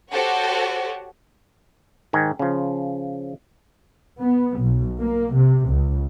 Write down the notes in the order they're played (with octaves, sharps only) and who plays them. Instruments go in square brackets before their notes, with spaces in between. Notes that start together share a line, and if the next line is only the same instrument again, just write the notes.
[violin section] F#4 G4 A4 C5 C#5 F#5
[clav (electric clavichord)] G#2 D#3 G#5
C#3 F3
[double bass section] B3
B1
A#3
C3
C#2